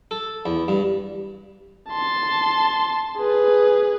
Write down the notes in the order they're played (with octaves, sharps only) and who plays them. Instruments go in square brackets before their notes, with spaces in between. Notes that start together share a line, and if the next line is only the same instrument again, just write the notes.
[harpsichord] A4
E2
G2
[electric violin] A5 C6
G#4 B4